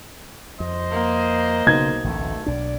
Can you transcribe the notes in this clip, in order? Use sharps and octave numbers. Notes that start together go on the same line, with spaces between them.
F2 C5 D#5
A#3
B1 C#3 G#6
A1 D2 A3
B1 D4 D5